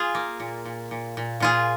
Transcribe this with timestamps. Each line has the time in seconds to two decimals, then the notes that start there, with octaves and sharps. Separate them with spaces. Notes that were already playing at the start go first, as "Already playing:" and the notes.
Already playing: F4 G#4
0.15 A#3
0.40 A#2
0.65 A#2
0.91 A#2
1.17 A#2
1.40 A#2 F4 G#4